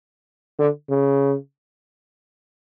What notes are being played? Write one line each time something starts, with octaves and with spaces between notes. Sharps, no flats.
D3
C#3